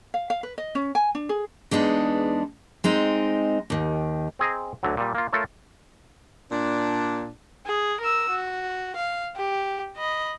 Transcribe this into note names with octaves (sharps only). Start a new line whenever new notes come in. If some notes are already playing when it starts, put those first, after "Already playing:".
F5
F5
B4
D#5
C#4
G#5
D4
G#4
E2 G#3 B3 D4 D#4
G#3 C4 D#4
D#2 D#3
C4 G#4 D#5 A#5
D2 D3 F#3
A#2 G3
A#3 F4
A3 F4 A4 A#4 C#5
A#2 D4
G#4
A#4 E6
F#4
F5
G4
D#5 B5